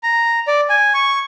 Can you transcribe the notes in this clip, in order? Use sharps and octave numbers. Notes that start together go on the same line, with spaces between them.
A#5
D5
G#5
C#6